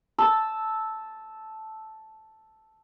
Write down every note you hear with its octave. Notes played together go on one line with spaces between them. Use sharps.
A5 E6